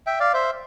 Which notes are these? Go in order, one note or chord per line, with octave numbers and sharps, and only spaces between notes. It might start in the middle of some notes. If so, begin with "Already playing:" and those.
E5 G5
D5 F5
C5 E5